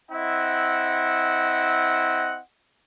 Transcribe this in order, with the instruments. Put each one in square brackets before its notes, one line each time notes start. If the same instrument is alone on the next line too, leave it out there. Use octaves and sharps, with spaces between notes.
[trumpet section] C4 E4 D#5 F#5